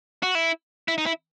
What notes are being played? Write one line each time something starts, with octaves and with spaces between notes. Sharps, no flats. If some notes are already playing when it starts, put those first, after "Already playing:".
F#4
E4
E4
D#4
E4